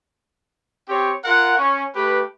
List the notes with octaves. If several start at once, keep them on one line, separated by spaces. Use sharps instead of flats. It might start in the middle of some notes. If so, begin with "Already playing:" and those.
C4 G4 C#5 G5
F4 A#4 F#5
C#4
A3 G4 B4